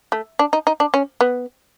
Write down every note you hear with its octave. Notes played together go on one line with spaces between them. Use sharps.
A3
D4
D#4
D#4
D4
C#4
B3